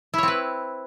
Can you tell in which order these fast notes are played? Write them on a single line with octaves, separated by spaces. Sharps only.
E4 C#5 C4 B4